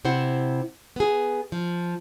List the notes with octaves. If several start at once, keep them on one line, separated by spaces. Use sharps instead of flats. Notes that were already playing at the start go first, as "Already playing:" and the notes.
C3 E4 C5 F#5
B3 G#4
F3